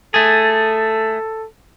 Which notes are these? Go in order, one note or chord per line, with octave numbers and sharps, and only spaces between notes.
A3 G#4 A4